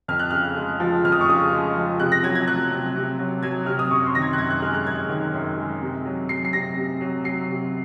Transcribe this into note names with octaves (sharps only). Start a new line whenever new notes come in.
F2 F6
F#6
C#3 F6
G#3
F3
F2 F6
D#6
C#6
C#3 D#6
G#3
F3
C3 F#6
A#6
F#3 G#6
G#6
F#3 F#6
C3
C3
F#3
F#3 G#6
C3 F6
D#6
F#2 C#6
C6
D#3 A#6
G#6
F#6
F#2 G#6
F#6
G#3 F6
F#6
F#2 G#6
D#3
F#2
G#3
C3
F#3
F#3 C7
C7
C3 A#6
C3
F#3
F#3 C7
C3